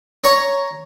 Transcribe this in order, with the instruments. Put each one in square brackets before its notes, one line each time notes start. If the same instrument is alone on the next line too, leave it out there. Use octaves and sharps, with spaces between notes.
[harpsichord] C#5 A#5 C#6